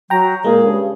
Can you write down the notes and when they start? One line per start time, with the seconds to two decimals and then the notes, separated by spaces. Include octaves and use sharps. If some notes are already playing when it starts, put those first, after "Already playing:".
0.10 F#3 G5 A#5
0.44 A#2 G#3 A#3 G#4
0.63 G2 C#3